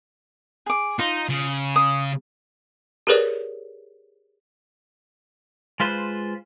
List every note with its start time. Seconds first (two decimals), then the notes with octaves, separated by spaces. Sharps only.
0.66 G#4 D6
0.99 D#4 F4
1.29 C#3
1.76 D#6
3.07 G4 G#4 A#4 B4 C#5 D5
5.80 G#3 F4 B4 C5